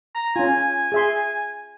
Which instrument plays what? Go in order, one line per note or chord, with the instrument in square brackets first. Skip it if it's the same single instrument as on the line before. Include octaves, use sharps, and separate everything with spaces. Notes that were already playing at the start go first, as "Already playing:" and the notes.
[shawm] A#5
[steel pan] C#4 F4 [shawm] G#5
[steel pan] G#4 E5 C6